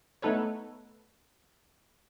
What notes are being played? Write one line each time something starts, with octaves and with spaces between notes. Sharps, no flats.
A3 B3 D#4 A4 B4 C#5